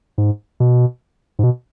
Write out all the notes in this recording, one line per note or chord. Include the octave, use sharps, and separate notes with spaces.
G#2
B2
G#2
B2